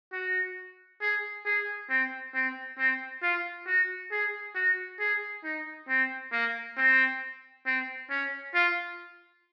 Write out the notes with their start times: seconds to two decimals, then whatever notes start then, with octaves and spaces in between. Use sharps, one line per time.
0.12 F#4
1.01 G#4
1.45 G#4
1.90 C4
2.34 C4
2.78 C4
3.23 F4
3.67 F#4
4.12 G#4
4.55 F#4
5.00 G#4
5.44 D#4
5.89 C4
6.32 A#3
6.77 C4
7.66 C4
8.10 C#4
8.54 F4